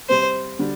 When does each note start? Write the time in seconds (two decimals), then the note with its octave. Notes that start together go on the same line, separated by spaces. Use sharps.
0.09 C3 G3 C4 C5
0.59 D3 G3 D4